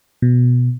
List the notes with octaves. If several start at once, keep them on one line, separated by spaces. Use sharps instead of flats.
B2